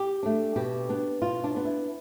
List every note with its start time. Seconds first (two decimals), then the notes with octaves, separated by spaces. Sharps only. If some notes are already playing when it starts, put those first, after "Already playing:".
Already playing: G4
0.23 A3 D4
0.56 B2 G4
0.89 B3 D4
1.22 B2 F4
1.44 D4
1.55 B3 D4
1.65 E4